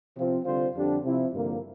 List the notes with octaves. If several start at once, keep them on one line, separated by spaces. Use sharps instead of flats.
C3 F3 C4 F4
D3 G3 C4 F4 C5
F2 D3 G3 D4 G4
C3 F3 C4 E4
G2 D3 F3 A#3